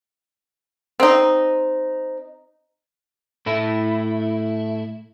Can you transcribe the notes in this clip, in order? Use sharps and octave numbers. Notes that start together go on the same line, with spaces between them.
C4 D#4
A2 A3 E4